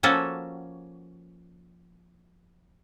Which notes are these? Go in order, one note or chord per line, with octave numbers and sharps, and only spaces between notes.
F3 A#3 C#4 F#4 A4